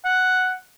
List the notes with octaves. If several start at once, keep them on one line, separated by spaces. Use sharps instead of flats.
F#5